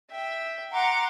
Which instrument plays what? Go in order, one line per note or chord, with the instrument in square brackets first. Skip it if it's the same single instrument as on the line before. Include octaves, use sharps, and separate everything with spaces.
[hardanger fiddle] E5 G5
[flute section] F#5 A#5 [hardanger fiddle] C6 D6